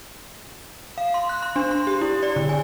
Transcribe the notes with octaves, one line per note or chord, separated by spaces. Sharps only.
F5
C6
F#6
C6
D4
C6
G4
E4
D5
D3
G#5